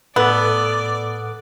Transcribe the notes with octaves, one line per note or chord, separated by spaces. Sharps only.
A2 B3 A4 D5 E6